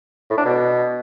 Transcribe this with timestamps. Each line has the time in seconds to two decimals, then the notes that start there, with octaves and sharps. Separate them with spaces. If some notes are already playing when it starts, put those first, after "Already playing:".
0.30 A2
0.38 D4
0.46 B2